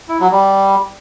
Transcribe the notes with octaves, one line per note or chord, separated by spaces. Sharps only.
E4
F#3
G3